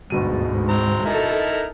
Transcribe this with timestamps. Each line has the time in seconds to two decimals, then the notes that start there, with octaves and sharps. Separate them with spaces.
0.10 G1 D2 G#2 B2 D#7
0.69 C4 A#5
1.06 D#4 E4 A4 A#4